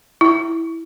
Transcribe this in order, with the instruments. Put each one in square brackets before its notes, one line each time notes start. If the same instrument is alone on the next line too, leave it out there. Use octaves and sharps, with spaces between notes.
[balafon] E4